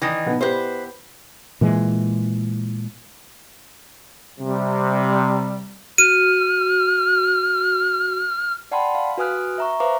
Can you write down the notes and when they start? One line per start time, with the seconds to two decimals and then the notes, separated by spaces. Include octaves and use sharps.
0.02 D#3 E3 A#6
0.26 B2 B3 D#4
0.41 B3 E4 G4 B4 C5
1.61 A#2 E3 G#3
4.39 C3 G3
5.98 F#4 F6 D#7
8.71 D5 F#5 G5 A5 B5 C6
8.95 F5
9.18 F#4 B4 G#5 D#6 F6 F#6
9.58 E5 A#5 C#6
9.80 B4 C5 E5 F5 A#5 D6